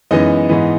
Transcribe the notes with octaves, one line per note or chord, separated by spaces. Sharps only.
F#2 E3 G#3 B3 D#4 D#5
G#2 E3 B3